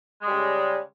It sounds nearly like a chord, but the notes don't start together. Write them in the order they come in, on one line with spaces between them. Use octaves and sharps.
G#3 G3 C#3